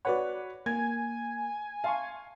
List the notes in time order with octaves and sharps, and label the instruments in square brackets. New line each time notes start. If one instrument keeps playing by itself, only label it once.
[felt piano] F#4 B4 C#5 [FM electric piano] D5 F#5
[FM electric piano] A#3 [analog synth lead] G#5 [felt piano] G#6
[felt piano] F5 [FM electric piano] A5 C6 C#6